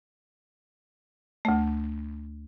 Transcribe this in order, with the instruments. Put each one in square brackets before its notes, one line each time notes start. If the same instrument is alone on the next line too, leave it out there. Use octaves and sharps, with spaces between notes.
[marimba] D2 A3